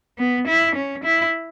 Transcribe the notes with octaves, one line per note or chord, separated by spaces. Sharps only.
B3
E4
C#4
E4